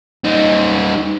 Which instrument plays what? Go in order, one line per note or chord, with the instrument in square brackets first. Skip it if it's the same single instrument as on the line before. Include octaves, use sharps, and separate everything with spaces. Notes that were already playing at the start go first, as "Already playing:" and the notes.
[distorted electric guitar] G3 D#4